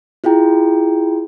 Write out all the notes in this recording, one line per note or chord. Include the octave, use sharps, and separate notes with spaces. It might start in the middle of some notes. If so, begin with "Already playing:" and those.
E4 F4 G#4 G5 A#5